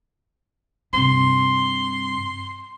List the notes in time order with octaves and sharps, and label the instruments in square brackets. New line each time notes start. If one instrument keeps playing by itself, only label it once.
[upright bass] G2 C3 [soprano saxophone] C6